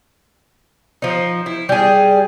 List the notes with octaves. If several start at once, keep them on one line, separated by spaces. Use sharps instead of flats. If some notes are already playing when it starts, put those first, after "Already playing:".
F3 D#4
E4
G3 G#4